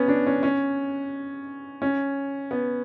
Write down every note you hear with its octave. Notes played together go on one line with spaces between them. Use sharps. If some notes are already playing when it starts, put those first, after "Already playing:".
Already playing: B3 C#4
D4
C#4
C#4
C#4
B3